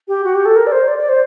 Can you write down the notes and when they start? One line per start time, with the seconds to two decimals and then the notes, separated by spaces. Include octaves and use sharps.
0.08 G4
0.24 F#4
0.35 G4
0.45 A4
0.56 A#4
0.67 D5
0.72 C5
0.88 D5
0.98 D5
1.09 C5